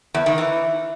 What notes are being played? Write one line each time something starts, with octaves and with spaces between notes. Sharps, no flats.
E2
D#3
E3